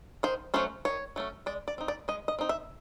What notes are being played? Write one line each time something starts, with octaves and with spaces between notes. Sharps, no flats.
D#3 C5
F#3 A3 C#4 C5
D#3 C#5
F#3 A3 C#4
G#3 D5
D5
C4 D#4
D5
G#3 D#5
D#5
C4 D#4
E5